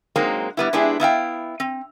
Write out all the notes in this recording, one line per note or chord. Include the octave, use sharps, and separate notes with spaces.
F#3 G#3 A#3 C4 D#4
G3 B3 E4
G#3 B3 D4 E4 G4 G#4
B3 E4 F5 G5
C4